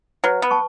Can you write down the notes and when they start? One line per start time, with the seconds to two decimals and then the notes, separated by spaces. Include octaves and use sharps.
0.24 F#3 B4
0.42 B3
0.51 A5 C#6